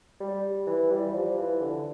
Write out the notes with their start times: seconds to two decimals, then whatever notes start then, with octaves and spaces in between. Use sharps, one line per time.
0.20 G3
0.67 E3
0.91 G3
1.13 F3
1.38 E3
1.61 D3